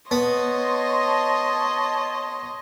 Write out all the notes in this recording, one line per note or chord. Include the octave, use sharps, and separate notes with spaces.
B3 C#5 D#5 A5 C6